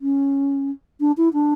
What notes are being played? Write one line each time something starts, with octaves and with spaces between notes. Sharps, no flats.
C#4
D4
E4
D4